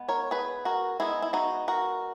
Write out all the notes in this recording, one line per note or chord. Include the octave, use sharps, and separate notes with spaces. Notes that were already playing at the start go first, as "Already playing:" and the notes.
Already playing: G#3 B3
A#4 C#5
G#4 B4
F#4 A#4
G#3 B3 D#4 E4 G#4
E4
D#4 F#4
F#4 A#4